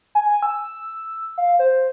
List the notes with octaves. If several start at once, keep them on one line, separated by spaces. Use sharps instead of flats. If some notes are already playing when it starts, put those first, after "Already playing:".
G#5
E6
F5
C5